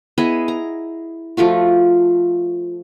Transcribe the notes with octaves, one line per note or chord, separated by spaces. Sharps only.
B3 E4 G#4 D#5
A#5
F3 A3 F4 F#4